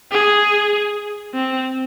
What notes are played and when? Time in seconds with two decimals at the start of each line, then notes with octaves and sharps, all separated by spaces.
0.11 G#4
1.34 C4